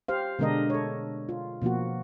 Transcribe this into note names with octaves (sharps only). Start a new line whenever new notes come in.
G4 C5 F5
B2 D3 G#3 D4 A#4 D#5
A4 C#5
F4
B2 F3 A#3 F#4